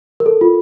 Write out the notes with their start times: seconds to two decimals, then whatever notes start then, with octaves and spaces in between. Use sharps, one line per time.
0.20 A#4
0.26 A4
0.41 F4